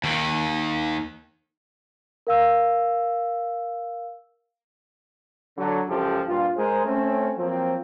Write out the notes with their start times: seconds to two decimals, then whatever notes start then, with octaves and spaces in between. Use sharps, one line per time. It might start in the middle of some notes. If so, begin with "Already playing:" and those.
0.04 D#2 D#3
2.27 A#4 F5 E6
5.58 D3 F#3
5.89 C#2 F#2 F3 G4 A4
6.28 G2 A#2 F4
6.57 G#3 G#4 A#4 C5
6.85 A3 C4 C#4
7.37 F3 F#3 A#3 C4